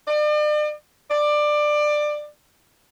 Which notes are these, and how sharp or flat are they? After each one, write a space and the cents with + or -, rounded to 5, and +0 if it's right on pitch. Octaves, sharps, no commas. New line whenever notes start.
D5 +40
D5 +20